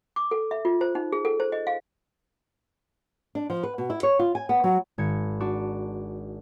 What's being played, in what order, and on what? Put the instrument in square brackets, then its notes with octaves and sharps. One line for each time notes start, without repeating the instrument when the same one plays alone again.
[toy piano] D6
A4
E5
F4
C5
D#4
G#4
A4
C5
D#5
F5
[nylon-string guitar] D4
F3
B4
B2
E4
C#5
F4
G#5
B3
F#3
[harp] G#1 G#6 C#7
D4 F#4 D6